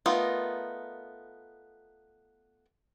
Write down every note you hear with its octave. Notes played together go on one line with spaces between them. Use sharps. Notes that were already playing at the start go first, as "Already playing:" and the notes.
A3 B3 D#4 F4 A#4